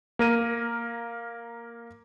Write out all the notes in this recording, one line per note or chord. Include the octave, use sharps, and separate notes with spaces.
A#3 A#4 D#7